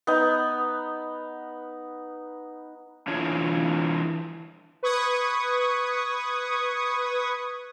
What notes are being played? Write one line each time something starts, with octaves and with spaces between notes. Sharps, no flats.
B3 D#4
E3 D4 F4 C#5
B4 C#6 D#6 G#6